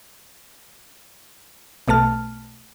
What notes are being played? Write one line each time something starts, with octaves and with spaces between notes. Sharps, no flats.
B1 B2 A3 A5 F6